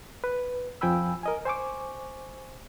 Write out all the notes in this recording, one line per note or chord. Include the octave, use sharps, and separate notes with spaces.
B4
F2 F3 G5 G#5 B5 E6
A#4 D#5 G#5
C5 G#5 C#6 D6